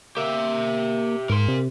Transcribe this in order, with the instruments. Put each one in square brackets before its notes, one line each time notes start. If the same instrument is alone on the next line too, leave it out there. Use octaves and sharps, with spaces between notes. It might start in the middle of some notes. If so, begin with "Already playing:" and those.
[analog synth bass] A#3 [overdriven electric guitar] G4 E5
[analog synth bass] G#2 [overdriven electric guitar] A#4 C6
[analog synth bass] C3